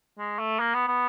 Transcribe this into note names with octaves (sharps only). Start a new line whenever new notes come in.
G#3
A3
A#3
B3
B3